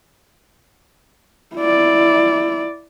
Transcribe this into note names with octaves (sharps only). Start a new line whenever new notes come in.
E4 D5